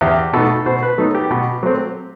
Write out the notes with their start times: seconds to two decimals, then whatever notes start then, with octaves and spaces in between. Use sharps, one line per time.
0.01 E2 G4
0.33 B2 A3 D#4 A4
0.66 B2 C5
0.83 B4
0.98 F#3 B3 D#4 A4
1.15 G4
1.31 B2
1.63 F#3 A3 C4